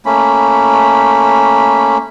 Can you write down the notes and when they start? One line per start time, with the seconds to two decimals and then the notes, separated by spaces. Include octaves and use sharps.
0.06 A3 A#3 C#4 B5